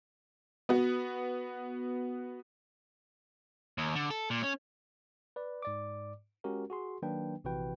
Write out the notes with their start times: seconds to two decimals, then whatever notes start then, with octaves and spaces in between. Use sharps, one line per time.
0.69 B3 F#4
3.78 D#2
3.95 D3
4.10 A4
4.30 A#2
4.43 C#4
5.36 B4 D5
5.62 G#2 D5 D6
6.44 G#3 C#4 F#4 G4 A#4
6.70 F#4 G#4 C6
7.02 D#3 F#3 A#3 D4 B4 G5
7.44 A#1 C3 E3 F#4 B4 G5